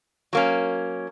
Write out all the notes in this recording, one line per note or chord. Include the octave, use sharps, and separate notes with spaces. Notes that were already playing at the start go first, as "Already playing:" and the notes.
F#3 A#3 C#4